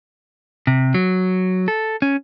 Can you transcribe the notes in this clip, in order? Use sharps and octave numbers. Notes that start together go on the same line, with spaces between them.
C3
F#3
A4
C#4